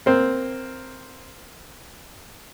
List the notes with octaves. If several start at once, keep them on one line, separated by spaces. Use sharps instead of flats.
A#3 C4